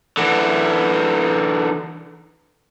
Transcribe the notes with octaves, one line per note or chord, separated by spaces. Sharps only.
D3 E3